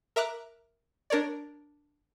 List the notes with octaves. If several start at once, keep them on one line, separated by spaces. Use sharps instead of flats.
A#4 E5 A#5 D6 F#6
D4 A#4 C#5 D5